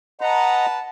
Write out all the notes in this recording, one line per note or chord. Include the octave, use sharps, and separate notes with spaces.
B4 D#5 F#5 A5 A#5